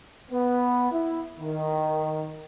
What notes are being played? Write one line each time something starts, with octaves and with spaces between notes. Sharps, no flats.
B3
E4
D#3